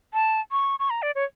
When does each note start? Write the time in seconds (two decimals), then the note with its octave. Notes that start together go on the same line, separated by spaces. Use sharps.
0.14 A5
0.52 C#6
0.80 C#6
0.90 A#5
1.02 D5
1.15 C#5